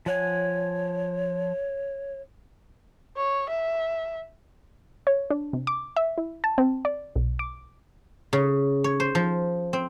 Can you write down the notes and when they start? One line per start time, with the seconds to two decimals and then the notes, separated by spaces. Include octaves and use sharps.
0.06 F3 C#5 F#5 G#5
3.17 C#5
3.49 E5
5.07 C#5
5.30 D4
5.53 C3
5.67 D6
5.97 E5
6.18 E4
6.44 A5
6.58 C4
6.85 D5
7.16 B1
7.39 D6
8.33 C#3
8.84 C#5
9.00 C5
9.15 F3
9.73 C4